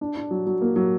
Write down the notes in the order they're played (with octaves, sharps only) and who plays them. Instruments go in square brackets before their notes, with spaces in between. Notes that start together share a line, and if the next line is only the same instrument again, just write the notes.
[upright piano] D4
D4
F#3
F#3
A#3
F#3